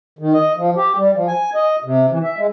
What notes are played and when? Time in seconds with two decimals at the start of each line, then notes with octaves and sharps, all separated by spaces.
0.19 D#3
0.33 D#5
0.57 F3
0.76 G4
0.96 G3
1.14 F3
1.28 G#5
1.55 D#5
1.84 C3
2.11 E3
2.23 E5
2.37 G#3